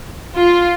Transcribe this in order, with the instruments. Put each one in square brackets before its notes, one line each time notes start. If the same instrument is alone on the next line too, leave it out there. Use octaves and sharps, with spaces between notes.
[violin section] F4